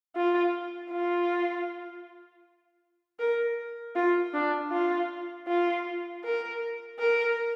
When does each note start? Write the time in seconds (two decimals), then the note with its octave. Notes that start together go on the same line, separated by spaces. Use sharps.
0.16 F4
0.91 F4
3.19 A#4
3.95 F4
4.34 D4
4.71 F4
5.48 F4
6.24 A#4
6.99 A#4